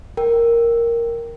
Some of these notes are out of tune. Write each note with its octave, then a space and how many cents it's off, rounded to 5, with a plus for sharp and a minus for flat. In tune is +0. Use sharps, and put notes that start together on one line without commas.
A#4 +0 G5 +0